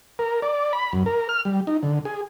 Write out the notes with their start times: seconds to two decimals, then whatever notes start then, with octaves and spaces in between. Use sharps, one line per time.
0.19 A#4
0.42 D5
0.73 B5
0.93 F#2
1.06 A#4
1.29 F6
1.45 G3
1.67 D#4
1.83 D3
2.05 G#4